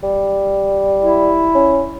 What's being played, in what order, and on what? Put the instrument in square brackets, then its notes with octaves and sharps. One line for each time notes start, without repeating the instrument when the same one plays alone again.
[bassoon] G3
[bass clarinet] E4
[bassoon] C#4